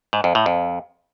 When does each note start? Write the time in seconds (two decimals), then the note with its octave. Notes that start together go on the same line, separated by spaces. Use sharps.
0.13 G#2
0.24 F2
0.35 A2
0.46 F2